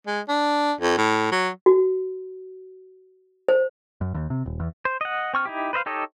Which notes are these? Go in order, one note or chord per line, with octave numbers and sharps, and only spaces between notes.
G#3
D4
F2
A2
F#3
F#4
C5
F#2
D#2
C3
D#1
E2
C5
D#5 F#5
C4 C#6 F6
D#4 E4 G4
B4 C5 D#5 F5
D#4 G4 A4 C#5 D#5